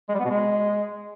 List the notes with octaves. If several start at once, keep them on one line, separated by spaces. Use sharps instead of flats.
G#3
G3
B3
B2
G#3